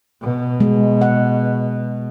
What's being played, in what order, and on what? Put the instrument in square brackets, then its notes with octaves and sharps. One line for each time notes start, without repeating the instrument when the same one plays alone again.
[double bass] B2
[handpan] G#3
F#5